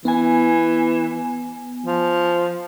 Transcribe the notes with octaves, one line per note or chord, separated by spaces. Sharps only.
E3 B3 G#5
F3